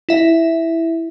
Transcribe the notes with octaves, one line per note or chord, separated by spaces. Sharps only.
E4 E5